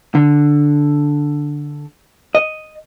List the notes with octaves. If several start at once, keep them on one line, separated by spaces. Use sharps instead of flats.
D3
D#5